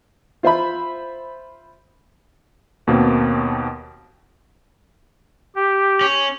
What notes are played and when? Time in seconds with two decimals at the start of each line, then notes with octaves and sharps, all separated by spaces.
0.43 F4 C5 E5 B5
2.87 D#2 B2 A#3 C4
5.56 G4
6.01 C#4